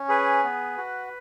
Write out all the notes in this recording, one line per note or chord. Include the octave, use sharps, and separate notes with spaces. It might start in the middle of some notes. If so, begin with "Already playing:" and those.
Already playing: C#4
G#4 B4
B3
F#4